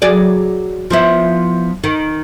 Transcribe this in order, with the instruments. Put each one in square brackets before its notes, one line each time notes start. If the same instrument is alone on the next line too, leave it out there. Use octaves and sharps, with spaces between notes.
[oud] F#3 G#4 D5
F3 B3 E4
D#3